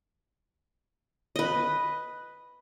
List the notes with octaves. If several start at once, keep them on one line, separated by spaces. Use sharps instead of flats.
B4 D#5